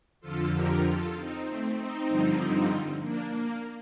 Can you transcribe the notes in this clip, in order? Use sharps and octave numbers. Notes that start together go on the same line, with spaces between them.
F2 D3 F3 F4 A4
G4 A#4
F4 A4
C4 D#4
A3 C4
C4 D#4
G2 D3 F3
A#3 D4
A#3